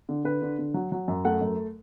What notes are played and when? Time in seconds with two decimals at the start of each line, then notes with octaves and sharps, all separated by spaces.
0.09 D3
0.24 D3 B4
0.42 D3
0.58 D3
0.74 F#3
0.92 F#3
1.08 F#2
1.25 A3 F#5
1.41 F#2